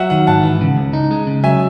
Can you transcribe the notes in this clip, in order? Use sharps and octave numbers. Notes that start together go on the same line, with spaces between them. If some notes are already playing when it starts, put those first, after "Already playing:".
Already playing: F#3 E5 F#5
D#3 F#5
G#2 F#5 A5
E3
C#3
C#2
D#4
G#3
C#3
F#3 E5 G#5